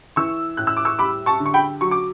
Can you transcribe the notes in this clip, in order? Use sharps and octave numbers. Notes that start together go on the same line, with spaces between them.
E3 C#6 E6
A2 F#6
E6
D6
C#6 E6
G3 B5 D6
A5 C#6
D3
C#6
G5 B5
F#3 C#6
D6